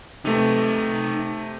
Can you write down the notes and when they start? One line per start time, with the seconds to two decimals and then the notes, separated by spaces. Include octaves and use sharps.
0.25 C3 A3 D#4 B4